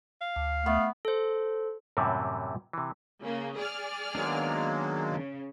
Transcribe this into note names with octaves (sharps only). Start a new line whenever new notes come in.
F5
D2
A3 B3
A4 C5
F#2 A2 C3 E3 F#3 G3
C3 E3
C#3 A#3
G#4 D5 F6
D#3 F#3 G#3 A#3 B3 D4
C#3